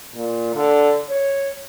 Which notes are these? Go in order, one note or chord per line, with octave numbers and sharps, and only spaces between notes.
A#2
D3
C#5